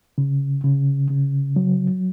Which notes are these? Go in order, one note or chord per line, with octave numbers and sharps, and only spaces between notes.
C#3
C#3
C#3
F#3